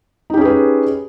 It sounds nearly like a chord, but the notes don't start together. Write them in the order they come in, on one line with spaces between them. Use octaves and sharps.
D#4 G4 C#4 G#4 B4